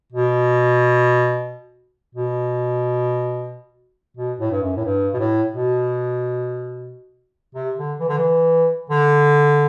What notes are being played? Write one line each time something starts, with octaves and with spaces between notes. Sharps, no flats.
B2
B2
B2
A2
G2
F#2
A2
G2
B2
A2
B2
C3
D3
E3
D3
E3
D3